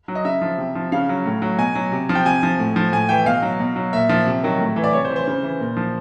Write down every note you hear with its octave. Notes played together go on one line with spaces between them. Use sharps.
F#3
D#5
C#3 E5
F3
C3
F3
C#3 F5
F#3
A2
F#3
B2 G#5
F#3
C3
F3
G5
C3 G#5
F3
A2
F3
A2 G#5
E3 G5
B2 F5
F#3
B2
F#3
A#2 E5
F3
C3
D#3 F#3
A2
E3
D5
C3 C#5
C5
E3
C5
C#3
E3
A#2
F3